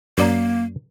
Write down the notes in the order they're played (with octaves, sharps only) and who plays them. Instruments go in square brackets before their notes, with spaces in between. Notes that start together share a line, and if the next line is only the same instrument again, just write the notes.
[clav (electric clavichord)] F#2 D5 A#5 [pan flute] A#3